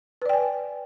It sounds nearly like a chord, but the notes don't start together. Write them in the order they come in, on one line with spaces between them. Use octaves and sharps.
B4 D5 G5 G#5